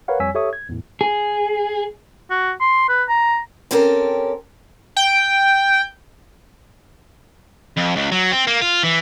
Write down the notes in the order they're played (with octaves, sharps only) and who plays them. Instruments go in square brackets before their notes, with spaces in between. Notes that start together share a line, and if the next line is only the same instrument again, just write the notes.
[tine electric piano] A#4 B4 C#5 F5 F#5
F2 G3 C#5 G#5 E6 B6
G4 A4 C#5 E5 C#6 D#6
G#6
E2 A2
[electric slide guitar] G#4
[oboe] F#4
C6
B4
A#5
[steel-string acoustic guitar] C4 C#4 G4 A4 A#4
[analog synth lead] G5
[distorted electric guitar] F2
C#2
F#3
C4
A#3
F4
E3